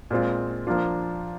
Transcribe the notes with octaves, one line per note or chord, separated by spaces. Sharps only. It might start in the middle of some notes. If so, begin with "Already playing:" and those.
A#2 G#3 C4 F4
F3 A#3 D4 F4